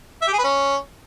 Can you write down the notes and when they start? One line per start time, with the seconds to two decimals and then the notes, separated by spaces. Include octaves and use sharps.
0.22 E5
0.27 G4
0.33 G#4
0.39 B4
0.44 C#4